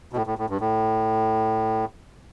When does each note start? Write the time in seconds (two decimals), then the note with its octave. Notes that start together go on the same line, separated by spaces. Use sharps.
0.12 B2
0.16 A2
0.27 A2
0.38 A2
0.50 G2
0.60 A2